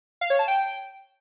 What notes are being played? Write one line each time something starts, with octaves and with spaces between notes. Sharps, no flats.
F5
C#5
A5
G5